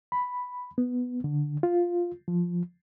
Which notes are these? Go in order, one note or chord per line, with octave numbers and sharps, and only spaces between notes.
B5
B3
D3
F4
F3